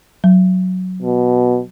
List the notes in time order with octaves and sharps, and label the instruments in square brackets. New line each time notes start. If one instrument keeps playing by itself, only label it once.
[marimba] F#3
[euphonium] B2